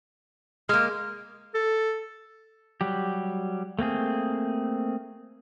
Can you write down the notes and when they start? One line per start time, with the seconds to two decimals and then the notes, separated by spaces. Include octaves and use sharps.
0.69 G#3 A#3 F6
1.54 A4
2.81 F#3 G3 G4
3.79 A3 A#3 C4 G#4